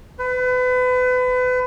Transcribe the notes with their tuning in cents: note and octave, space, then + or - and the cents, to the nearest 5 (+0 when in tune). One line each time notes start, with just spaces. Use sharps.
B4 +30